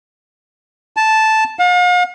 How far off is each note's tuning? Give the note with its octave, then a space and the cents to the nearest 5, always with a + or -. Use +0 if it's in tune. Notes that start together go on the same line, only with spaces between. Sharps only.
A5 -5
F5 +45